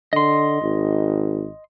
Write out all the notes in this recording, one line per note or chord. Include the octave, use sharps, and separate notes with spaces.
D3 D#5 C6
G#1